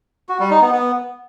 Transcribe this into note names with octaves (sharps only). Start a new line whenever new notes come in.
F#4
G3
D#4
B3
B3